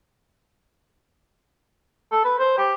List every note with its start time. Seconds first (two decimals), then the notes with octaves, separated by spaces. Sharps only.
2.12 A4
2.24 B4
2.39 C5
2.58 G4